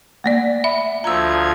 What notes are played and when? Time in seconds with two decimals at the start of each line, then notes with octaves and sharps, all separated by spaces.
0.24 A3 A#3 D5
0.64 E5 B5
1.04 D2 F3 A#5 E6 G#6